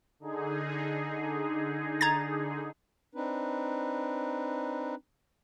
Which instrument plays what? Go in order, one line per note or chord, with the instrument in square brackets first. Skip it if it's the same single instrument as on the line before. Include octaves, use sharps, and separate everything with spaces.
[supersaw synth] D3 D#4 G#4
[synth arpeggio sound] A#5 G#6 A6
[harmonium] C4 D4 D#4 B4